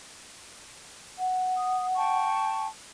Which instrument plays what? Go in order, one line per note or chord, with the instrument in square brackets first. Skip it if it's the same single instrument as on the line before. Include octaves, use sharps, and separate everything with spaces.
[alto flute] F#5
[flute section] D#6
G5 A5 C#6